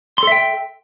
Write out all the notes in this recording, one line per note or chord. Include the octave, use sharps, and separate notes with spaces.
A4 E5 G5 C6